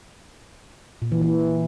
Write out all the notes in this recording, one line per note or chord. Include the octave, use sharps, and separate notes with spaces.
A#2
E3
E3